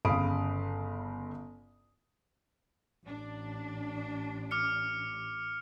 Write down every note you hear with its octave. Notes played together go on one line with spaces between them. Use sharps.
G1 C#3 F5 B5 D#6 D7
A1 D4
D6 F6 C#7